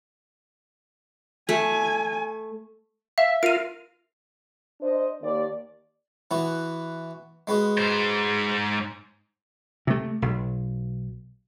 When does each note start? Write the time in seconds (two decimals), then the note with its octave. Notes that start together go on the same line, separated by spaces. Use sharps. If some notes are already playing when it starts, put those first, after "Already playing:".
1.49 A3 G#5
3.18 E5 F5
3.43 F4 A#4 F5 D7 D#7
4.81 D4 C5 D#5
5.22 D#2 D5
6.31 E3 B3 F#4
7.47 G#3 B3 F#4
7.78 G#2 C5
9.87 C3 A3
10.22 B1